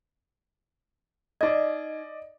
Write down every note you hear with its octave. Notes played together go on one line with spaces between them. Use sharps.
D#4 D5 D#5 G#6